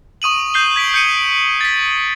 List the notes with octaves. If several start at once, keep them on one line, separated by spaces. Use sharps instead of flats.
C#6 D#6 D#7 F#7
G6 C7 G7
G#6 B6 D7 F#7
G6 C#7 D#7
D7
A6 B6